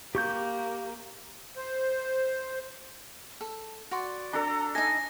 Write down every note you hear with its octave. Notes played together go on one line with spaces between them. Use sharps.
A#3 G4 C#6 G6
C5
A4
F#4 D5 C6
D4 A4 A#5
D#4 D#5 G#5 A5 A#6